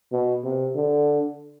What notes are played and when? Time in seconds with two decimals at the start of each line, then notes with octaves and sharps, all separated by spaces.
0.12 B2
0.44 C3
0.75 D3